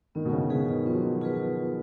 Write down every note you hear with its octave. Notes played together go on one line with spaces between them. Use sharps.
D#3 B3
B2
C#3
C#3 F4 G#4 B4
D#3
F3 B3
F#3
F3
F4 G#4 B4